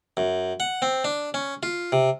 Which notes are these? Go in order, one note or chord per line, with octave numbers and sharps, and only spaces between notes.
F#2
F#5
C4
D4
C#4
F4
C3